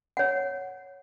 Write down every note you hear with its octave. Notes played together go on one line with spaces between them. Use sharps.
C#5 F#5